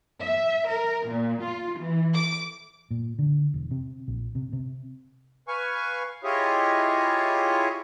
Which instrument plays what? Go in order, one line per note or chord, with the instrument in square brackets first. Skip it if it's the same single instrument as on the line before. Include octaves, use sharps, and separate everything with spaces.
[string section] E5
A#4
A#2
F4
E3
D6
[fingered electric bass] A#2
D3
E1
C3
A#1
C3
C3
[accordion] B4 F5 G#5 C#6
E4 F4 G4 G#4 C#5 D#5